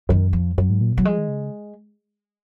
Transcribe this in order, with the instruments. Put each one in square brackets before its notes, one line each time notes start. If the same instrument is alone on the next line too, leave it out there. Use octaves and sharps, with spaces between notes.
[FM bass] F#2 [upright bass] D#3
[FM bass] F2 [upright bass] F3
[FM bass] F#2 [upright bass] F#3
[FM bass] G#2
A#2
[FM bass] B2 [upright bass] F#3
[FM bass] F3 [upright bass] G#3
[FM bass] D#3
C#3